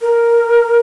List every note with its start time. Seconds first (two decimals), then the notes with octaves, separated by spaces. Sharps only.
0.01 A#4